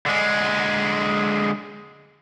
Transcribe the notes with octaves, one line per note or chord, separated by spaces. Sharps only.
D3 G#3